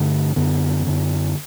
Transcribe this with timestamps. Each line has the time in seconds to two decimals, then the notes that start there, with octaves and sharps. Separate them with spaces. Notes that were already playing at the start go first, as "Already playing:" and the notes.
Already playing: G2 D3 A3
0.36 F#2 D3 B3
0.86 F#2 D3